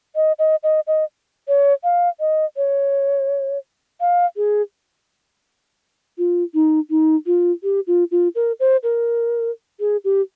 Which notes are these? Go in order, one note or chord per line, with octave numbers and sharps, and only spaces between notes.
D#5
D#5
D#5
D#5
C#5
F5
D#5
C#5
F5
G#4
F4
D#4
D#4
F4
G4
F4
F4
A#4
C5
A#4
G#4
G4